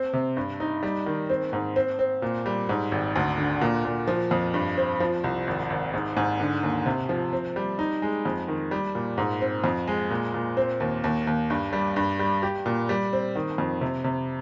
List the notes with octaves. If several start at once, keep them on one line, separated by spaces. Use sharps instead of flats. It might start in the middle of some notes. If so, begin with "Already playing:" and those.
Already playing: C4
C3
G2
D#4
G3
D#3
C4
G#2
C4
C4
A#2
G3
G#2
G#1
D2
D3
A#2
A#2
F3
F2
G2
C4
F3
C2
G#1
G#1
G#2
G#2
D3
D#2
C3
F3
C4
G3
D#4
G#3
F2
D#3
G3
A#2
G#2
C4
F2
G#3
A#2
A#2
C4
D#2
D#2
D#2
G2
G3
G2
G3
G4
A#2
G3
C4
D#3
F2
C3
C3